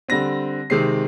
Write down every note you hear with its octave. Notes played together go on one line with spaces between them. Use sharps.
D3 G3 C4 A#6
C3 D#3 G#3 C4 C7